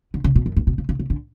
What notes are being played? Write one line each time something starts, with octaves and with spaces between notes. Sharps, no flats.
D3
C#3
B2
F#2
G2
B2
C#3
C#3
C#3
D3